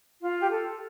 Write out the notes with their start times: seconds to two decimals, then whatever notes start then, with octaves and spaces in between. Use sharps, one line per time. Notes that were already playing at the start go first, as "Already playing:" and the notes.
0.22 F4
0.40 G4
0.50 A4